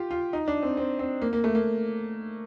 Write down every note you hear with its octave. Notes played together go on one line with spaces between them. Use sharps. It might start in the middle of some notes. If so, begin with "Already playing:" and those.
Already playing: F4 G4
F4
D#4
D4
C4
C4
C4
A#3
A#3
A3
A#3